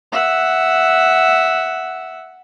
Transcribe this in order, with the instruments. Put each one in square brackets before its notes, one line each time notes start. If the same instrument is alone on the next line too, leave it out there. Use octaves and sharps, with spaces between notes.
[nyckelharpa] E5 F#5